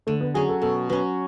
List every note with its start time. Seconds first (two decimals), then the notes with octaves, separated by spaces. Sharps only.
0.07 D3 A3
0.21 B3
0.34 F#3 C#4 G#4
0.49 A4
0.62 B2 A4
0.90 F#3 C#4 B4